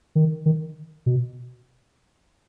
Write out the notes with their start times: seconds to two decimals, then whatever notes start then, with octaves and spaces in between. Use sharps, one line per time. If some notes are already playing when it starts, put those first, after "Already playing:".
0.15 D#3
0.46 D#3
1.06 B2